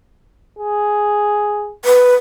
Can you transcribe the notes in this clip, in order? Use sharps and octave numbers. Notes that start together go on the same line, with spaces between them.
G#4
B4